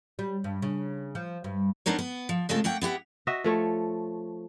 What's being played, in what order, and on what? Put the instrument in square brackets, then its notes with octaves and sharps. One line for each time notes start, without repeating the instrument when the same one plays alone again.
[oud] G3
G2
C#3
F3
G2
[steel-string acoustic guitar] B3 D4 D#4 A#4 C#5
B3
F3
C#3 G#3 A3 C4 F4 A4
A3 A#3 F#5 G5
B3 E4 G4 F#5
[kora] F#4 D#5 E5
F3 A3 C#5